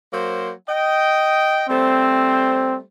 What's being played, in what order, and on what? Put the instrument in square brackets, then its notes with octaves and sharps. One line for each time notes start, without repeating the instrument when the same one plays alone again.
[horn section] F#3 A#3 C5
D#5 G5
[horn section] G3 A3 C5 [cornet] C4